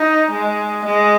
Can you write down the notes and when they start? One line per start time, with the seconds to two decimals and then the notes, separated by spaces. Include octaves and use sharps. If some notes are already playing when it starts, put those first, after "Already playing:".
Already playing: D#4
0.31 G#3
0.85 G#3